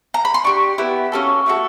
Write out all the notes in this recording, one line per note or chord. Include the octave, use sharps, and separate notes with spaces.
A#5
B5
C6
D4 G4 C#6
B3 E4 G4
A#3 C#4 F#4 A4
A3 D4 F#4 A4